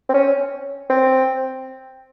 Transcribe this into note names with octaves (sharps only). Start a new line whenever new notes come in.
C4
C#4
C4